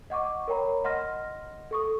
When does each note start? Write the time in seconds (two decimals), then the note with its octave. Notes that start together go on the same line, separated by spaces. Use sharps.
0.10 D#5 F#5 C#6 D6
0.48 A#4 C#5 G5 A#5 B5
0.84 D#5 F#5 C6 F6 A#6
1.71 A4 C#6 D#6